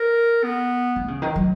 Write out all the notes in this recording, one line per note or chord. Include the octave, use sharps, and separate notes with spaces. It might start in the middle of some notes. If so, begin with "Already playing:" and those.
Already playing: A#4
B3
D#3
C#3
D#3
F#3